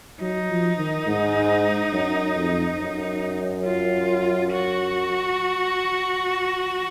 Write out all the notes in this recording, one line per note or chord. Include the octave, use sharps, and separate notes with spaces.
F#3 D#4
F3
D#3
G#2
F#2
F2
F#2
F4
F#4